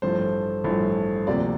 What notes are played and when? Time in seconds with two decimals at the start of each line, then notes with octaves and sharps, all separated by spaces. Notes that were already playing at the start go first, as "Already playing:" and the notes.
0.02 A1 G2 F3 A3 C5
0.64 A1 G2 F3 A3
1.27 D2 C3 F3 A#3 D5